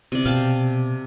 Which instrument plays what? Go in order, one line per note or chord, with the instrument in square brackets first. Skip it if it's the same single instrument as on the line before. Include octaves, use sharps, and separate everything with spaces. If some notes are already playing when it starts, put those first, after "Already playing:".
[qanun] C3 D5
[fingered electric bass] B2 [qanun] F5 G5 A5